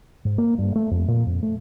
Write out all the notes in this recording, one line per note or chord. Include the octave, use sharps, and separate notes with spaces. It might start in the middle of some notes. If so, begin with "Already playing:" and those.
G#2
A#3
G2
A3
F2
A#2
F2
A3